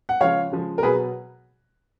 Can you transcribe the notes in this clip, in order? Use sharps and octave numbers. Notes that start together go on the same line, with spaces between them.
F#5
C#3 F3 G#3 C#5 F5
C#3 F3 G#3
A#4
B2 F#3 G#4 B4